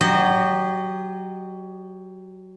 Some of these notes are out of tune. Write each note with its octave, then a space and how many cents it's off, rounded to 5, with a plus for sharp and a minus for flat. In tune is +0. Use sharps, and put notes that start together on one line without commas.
F#3 +15 G4 +0 D#5 -30